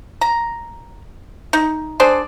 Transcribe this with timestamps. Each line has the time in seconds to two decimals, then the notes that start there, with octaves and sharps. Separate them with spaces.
0.21 A#5
1.53 D#4
2.00 D4 G#4 C5 D5